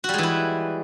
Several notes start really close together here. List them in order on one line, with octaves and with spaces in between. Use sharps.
F#4 G3 G#3 E3 E4